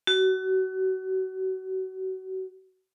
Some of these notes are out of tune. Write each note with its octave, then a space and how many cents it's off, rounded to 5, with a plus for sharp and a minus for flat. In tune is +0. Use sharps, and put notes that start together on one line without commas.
F#4 +30